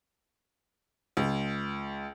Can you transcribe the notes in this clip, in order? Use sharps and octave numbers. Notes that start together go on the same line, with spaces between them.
C#2